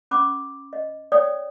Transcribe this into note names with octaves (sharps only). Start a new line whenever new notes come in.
C#4 B5 D6
D#5
C#5 D5 G5 D#6